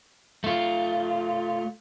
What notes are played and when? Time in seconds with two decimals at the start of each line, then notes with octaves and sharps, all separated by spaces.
0.44 A3 F4